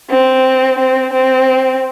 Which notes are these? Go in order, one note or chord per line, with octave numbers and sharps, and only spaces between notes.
C4
C4
C4